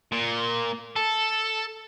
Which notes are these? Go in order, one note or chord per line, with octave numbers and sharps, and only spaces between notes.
A#2
A4